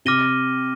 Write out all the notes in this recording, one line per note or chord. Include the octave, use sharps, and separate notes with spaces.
C3 D6 F6 A#6 D#7 G7